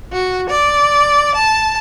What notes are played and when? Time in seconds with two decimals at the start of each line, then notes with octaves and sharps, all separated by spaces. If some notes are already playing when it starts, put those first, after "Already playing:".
0.12 F#4
0.50 D5
1.36 A5